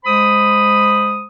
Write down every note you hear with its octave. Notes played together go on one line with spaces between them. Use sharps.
G#3 C5 B5 D#6